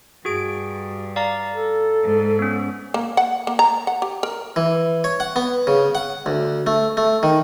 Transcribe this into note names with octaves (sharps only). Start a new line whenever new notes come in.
G2 F#4 G#4 D7
D5 F5 A#5
A4
G#2
B3 C#4
A#3
F#5
A#3
A#5
F#5
G4
A#4
E3
C#5
F#5
B3
C#3
F#5
D2
A3
A3
D#3